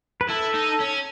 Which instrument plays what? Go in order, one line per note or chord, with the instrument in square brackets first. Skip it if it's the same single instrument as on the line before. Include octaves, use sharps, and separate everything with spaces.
[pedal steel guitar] B4
[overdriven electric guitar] E4 [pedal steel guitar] A4
[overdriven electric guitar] D#4
C#4